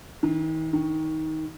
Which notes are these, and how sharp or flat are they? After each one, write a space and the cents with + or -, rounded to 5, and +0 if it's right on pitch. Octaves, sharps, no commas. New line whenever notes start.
D#3 +40
D#3 +20